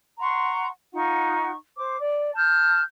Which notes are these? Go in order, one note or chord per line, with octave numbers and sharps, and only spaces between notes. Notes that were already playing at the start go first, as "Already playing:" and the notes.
F#5 A#5 C6 C#6
D#4 F4 F#5 C#6
C5 D6
D5
A5 F6 G6